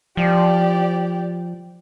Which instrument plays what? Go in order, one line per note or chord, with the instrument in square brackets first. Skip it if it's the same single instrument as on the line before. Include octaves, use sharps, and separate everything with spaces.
[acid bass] F3 [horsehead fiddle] G4 D5